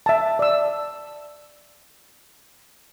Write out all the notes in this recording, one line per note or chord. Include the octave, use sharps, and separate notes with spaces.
E5 A5
D5 E6